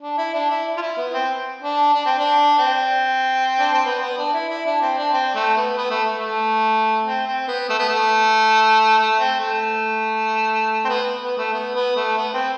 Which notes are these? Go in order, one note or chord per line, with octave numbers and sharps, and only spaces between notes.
D4
E4
D4
E4
F4
E4
B3
C4
D4
D4
C4
D4
C4
D4
C4
B3
B3
D4
E4
E4
D4
C4
D4
C4
A3
B3
B3
A3
A3
C4
C4
B3
A3
B3
A3
A3
C4
A3
C4
B3
B3
A3
B3
B3
A3
B3
C4